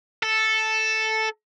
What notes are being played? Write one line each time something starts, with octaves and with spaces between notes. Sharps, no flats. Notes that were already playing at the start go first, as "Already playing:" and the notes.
A4